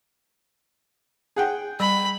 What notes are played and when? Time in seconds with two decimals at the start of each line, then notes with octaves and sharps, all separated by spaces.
1.36 G#4 F#5 G5
1.80 G3 B5